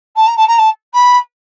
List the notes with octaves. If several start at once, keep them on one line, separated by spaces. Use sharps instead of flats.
A5
A#5
A5
A#5
A5
B5